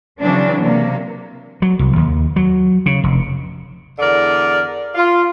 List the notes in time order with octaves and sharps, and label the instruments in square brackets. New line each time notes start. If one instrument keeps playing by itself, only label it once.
[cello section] C#3 E3 F#3 C4 D4
C3 A#3
[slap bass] F#3
C2
D#2
F#3
C#3
F1
[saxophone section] E2 D3 A#4 D5
F4